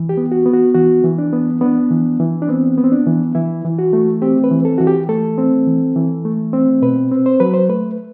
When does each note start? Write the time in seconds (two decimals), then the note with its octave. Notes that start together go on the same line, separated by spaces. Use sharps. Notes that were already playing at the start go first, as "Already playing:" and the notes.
Already playing: E3
0.09 G4
0.17 B3
0.32 F#4
0.46 B3
0.53 F#4
0.74 E3 F#4
1.04 E3
1.18 D4
1.33 B3
1.61 B3 D4
1.91 E3
2.20 E3
2.42 D4
2.49 B3 C4
2.78 B3
2.84 C4
2.92 D4
3.06 E3
3.35 E3 E4
3.65 E3
3.79 F#4
3.93 A3
4.22 C4 G4
4.44 B4
4.51 E3
4.65 A4
4.78 E3 F#4
4.87 G4
5.09 A3 A4
5.38 C4
5.67 E3
5.96 E3
6.25 A3
6.53 C4
6.82 B2 B4
7.12 C4
7.26 C5
7.40 F#3 B4
7.54 C5
7.69 A3 B4